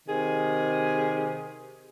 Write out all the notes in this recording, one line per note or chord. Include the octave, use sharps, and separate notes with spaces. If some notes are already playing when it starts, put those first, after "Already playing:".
C3 D#3 G#4